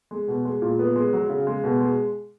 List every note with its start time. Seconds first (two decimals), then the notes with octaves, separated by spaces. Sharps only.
0.11 G#3
0.28 B2
0.45 G#3
0.62 A#2
0.79 B3
0.96 G#3
1.13 F#3
1.29 C#3
1.47 G#3
1.64 B2
1.81 G#3